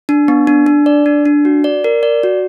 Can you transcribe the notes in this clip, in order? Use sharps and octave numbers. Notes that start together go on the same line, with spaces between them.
D4
B3
D4
D4
D5
D4
D4
F#4
D5
A#4
D5
F#4